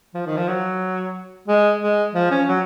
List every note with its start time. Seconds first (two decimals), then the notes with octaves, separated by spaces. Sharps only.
0.14 F3
0.26 D#3
0.37 F3
0.48 F#3
1.48 G#3
1.81 G#3
2.15 F3
2.31 C#4
2.48 F#3